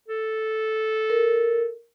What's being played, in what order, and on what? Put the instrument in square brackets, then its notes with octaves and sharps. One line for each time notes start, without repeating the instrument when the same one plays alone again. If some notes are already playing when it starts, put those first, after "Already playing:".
[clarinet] A4
[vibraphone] A#4